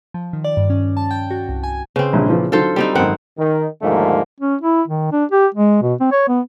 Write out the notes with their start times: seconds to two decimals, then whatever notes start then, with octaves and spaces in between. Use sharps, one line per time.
0.14 F3
0.33 D#3
0.44 D5
0.57 G2
0.70 C#4
0.97 A5
1.11 G5
1.31 F#4
1.49 C2
1.64 G#5
1.96 C#3 C4 B4
2.13 A#1 G2 A#2
2.26 A#2 E3 F3
2.52 D3 D#3 F#3 F4 A4 C5
2.76 G3 C4 D#4
2.95 G#1 F#2 C4 A#4 F#5
3.39 D#3
3.82 D#2 G#2 D3 F3 A3 A#3
4.40 C#4
4.61 E4
4.88 D#3
5.12 D4
5.31 G4
5.54 G#3
5.82 B2
6.00 C4
6.12 C#5
6.28 B3